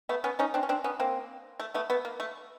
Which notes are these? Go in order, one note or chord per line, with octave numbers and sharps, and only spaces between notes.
A3 B3
B3 C#4
C#4 D#4
C4 D4
C#4
C4 D4
B3 C#4
A#3 C4
A3
A3 B3
A3 B3
A#3
A3